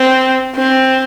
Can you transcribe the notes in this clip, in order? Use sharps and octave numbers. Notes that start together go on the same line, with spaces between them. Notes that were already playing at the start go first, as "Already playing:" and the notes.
Already playing: C4
C4